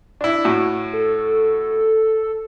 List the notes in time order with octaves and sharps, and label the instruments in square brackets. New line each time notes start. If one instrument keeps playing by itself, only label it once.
[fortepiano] D4 E4
A2 F#4
[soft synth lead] A4